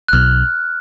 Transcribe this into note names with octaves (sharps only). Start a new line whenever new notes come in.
F#6
B1 B2 F#3 F6